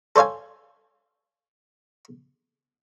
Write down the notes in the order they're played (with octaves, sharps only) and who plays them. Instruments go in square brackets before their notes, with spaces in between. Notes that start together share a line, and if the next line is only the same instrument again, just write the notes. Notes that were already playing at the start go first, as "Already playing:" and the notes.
[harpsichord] A4 C5 C#5 F5 G#5